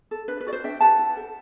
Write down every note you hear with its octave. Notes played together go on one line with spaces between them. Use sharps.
A4
D4 B4
B4
F#4 A4 D5
C5
D4 E5 G5
G4 B4 F#5 A5
E4
A4